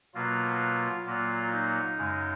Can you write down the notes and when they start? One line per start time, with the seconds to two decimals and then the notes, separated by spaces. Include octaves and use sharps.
0.15 B2 F#3 A#3 F4
1.06 A#2 F#3 A#3 F4
1.52 D#4
1.98 F#2 C#3 G#3